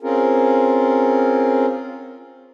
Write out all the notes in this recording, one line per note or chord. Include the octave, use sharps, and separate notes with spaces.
C4 C#4 F4 G#4 A#4